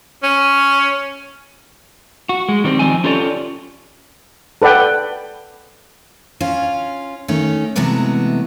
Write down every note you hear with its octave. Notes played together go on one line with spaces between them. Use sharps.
C#4
F#4
G#3
D#3 G3 C4
D#3 F3 C4 D#4 G#5
C#4 F4 G4 A4 C#5 D5
A4 B4 D5 F#5 G5
C#4 F4
D#3 A3 C#4
C3 E3 F#3 G#3 A3 B3